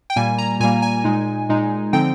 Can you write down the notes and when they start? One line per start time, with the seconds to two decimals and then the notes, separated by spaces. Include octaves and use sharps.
0.10 G5
0.16 A#2 G3 A#3 G#5
0.38 A#5
0.60 A#2 G3 A#3 G#5
0.82 G#5
1.04 A#2 G#3 D#4
1.49 A#2 G#3 D#4
1.93 D3 F3 C4 D#4 G5